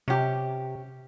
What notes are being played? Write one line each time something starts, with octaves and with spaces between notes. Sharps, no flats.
C3 C#4 G4